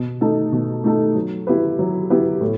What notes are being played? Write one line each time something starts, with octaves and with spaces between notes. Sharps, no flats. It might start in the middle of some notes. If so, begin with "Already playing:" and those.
Already playing: B2
A3 D#4 A4
B2
A3 D#4 A4
F#3
B3 E4 G4 B4
F#3
B3 E4 G4 B4
A2